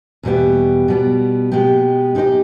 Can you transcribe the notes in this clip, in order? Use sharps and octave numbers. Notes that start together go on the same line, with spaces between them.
E2 B2 G3 B3 G4
B2 G3 B3
B2 G#3 B3 G4
G#3 D#4 G4 B4 D#5